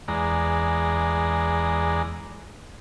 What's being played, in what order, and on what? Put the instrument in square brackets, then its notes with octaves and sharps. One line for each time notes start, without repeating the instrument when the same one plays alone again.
[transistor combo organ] E2 G#3 D5 A#5